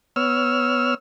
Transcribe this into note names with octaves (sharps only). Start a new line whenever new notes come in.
B3 C#5 E6 F6